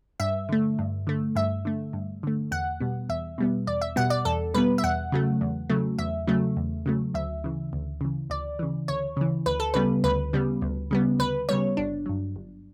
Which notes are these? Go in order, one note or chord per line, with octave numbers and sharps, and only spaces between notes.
G2 E5
D3 A3
G2
D3 A3
G2 E5
D3 A3
G2
D3 A3
E2 F#5
B2 G3 B3
E2 E5
B2 G3 B3
E2 D5
E5
B2 G3 B3 F#5
D5
E2 A4
B2 G3 B3 B4
E5
E2 F#5
C#3 F#3 A3
E2
C#3 F#3 A3
E2 E5
C#3 F#3 A3
E2
C#3 F#3 A3
D2 E5
C#3 E3
D2
C#3 E3
D2 D5
C#3 E3
D2 C#5
C#3 E3
D2 B4
A4
C#3 G3 B3 B4
D2 B4
C#3 G3 B3
D2
C#3 G3 B3
D2 B4
C#3 G3 B3 C#5
G1 D4
G2 F#3
G1